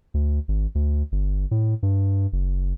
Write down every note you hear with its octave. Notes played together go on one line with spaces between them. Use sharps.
D2
G#1
D2
G1
A2
G2
F#1